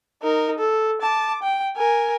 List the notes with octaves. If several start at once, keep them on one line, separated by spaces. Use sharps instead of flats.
D#4 A#4
A4
A5 D6
G5
A#4 G#5